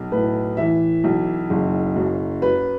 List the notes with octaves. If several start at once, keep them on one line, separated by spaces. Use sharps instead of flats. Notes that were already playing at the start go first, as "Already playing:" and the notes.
Already playing: B1
A2 B4
E3 E5
B1
F#1
F#2
F#3 B4